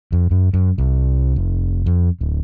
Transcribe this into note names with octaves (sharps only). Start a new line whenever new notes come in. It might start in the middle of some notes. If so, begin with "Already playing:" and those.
F2
F#2
F#2
C2
F1
F2
D1